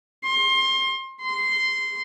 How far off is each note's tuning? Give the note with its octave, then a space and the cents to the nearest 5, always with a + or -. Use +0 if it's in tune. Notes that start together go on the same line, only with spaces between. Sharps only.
C6 +25
C6 -10